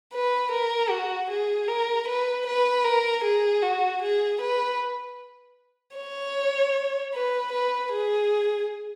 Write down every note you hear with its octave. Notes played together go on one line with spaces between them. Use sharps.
B4
A#4
F#4
G#4
A#4
B4
B4
A#4
G#4
F#4
G#4
B4
C#5
B4
B4
G#4